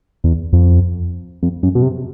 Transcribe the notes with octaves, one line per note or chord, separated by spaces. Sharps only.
E2
F2
F2
F#2
B2
C3